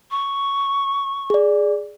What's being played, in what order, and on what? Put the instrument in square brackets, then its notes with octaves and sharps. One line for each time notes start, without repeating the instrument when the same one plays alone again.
[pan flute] C#6
[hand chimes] G#4 D5